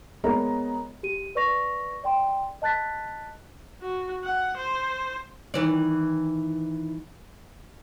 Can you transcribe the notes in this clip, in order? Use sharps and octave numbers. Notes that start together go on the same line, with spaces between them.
G#3 B3 A#4 C#5 D#5 A#5
G4 D#7
B4 D5 C#6 A#6 F7
D5 G5 C6
D#5 A5 F#6 A6 B6
F#4
F#5
C5
D#3 E3 D5